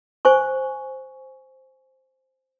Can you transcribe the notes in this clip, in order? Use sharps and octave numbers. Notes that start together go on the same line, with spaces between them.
C5 G#5 C#6